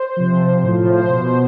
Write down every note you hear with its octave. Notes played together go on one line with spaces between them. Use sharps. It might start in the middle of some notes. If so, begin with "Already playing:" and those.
Already playing: C5
C3 F3
A2 F3
C5
B2